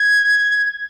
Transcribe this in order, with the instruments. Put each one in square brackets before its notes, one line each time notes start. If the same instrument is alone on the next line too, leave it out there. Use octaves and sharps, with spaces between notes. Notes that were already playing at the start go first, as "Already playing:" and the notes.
Already playing: [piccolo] G#6